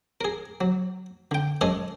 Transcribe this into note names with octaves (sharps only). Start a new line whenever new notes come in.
G#4 A#4
F#3
D3 G5
F#2 G#3 C#4 G#4 A4 D#5